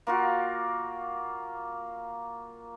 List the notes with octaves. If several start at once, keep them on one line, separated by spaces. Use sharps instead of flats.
A#3 F4 F#4